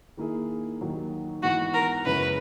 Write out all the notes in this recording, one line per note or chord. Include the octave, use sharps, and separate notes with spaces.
D#3 A#3 E4 G#4
D#2 D#3 F#3 A#3
G#2 E3 B3 F#4
A#4
F#2 C#3 G#3 C#4 E4 B4